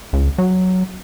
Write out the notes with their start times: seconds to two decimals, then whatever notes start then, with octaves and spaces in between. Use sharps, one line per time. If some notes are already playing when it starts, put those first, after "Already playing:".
0.13 C#2
0.38 F#3